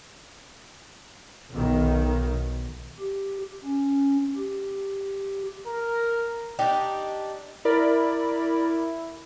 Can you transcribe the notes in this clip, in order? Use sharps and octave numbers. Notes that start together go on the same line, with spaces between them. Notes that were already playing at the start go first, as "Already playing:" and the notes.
B1 D#3
G4
C#4
G4
A#4
D4 D#4 G4
E4 A#4 D5 B5